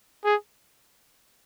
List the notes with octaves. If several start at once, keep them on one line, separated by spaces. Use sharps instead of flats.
G#4